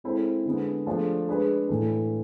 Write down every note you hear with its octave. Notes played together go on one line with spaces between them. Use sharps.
G#3 C4 E4 A4 C5
D3 G#3 B3
F3 A3 D4 G#4
G#3 D4 G#4 B4
A2 E3 A3